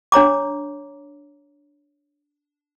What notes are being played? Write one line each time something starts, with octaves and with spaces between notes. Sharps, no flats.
D4 C#5 A#5 D6